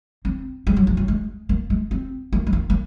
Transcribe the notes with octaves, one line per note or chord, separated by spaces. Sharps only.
C4
G#3
F#3
F3
F#3
G#3
A#3
G#3
C4
A#3
G#3
A#3
A#3